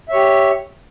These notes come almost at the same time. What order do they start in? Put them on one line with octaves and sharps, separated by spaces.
E5 C#5 G4